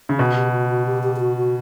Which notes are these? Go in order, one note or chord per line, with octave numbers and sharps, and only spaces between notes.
C#3
B2 F#4
G4
F#4
F#4
G4
G4
G4
F#4
F#4